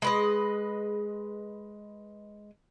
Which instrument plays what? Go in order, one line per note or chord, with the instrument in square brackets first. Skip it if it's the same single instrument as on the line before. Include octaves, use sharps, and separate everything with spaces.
[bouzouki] G#3 B4 D#5